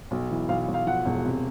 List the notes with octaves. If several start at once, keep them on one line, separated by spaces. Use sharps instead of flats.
B1
E3
B1 F5
B1
F5
F3 F#5
E1
C3